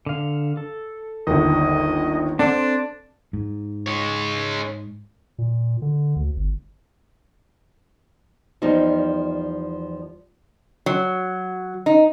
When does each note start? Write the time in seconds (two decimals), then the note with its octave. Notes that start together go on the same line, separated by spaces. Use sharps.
0.06 D3 F5
0.57 A4
1.27 G1 D#2 D#5
2.39 C4 D4 A4 C5
3.33 G#2
3.88 G#3 C#5
5.38 A#2
5.82 D3
6.16 D2
6.36 G1
8.62 E2 F3 G3 D#4
10.86 F#3
11.86 D#4